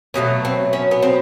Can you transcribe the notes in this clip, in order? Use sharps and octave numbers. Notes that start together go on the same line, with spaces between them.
B2 F#3 A3 C#4
C4
C#4
B3
C4